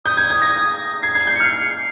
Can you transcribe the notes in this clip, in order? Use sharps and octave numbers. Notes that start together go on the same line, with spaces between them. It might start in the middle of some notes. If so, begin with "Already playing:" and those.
D#6 G6
G#6
G#6
A#6
G#6 C7
G#6
C7
G6
C#7
F6
C7